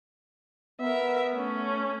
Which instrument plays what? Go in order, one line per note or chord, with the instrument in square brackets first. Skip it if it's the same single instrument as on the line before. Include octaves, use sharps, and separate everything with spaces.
[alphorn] B3 [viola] A#4 E5
[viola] A3 C#4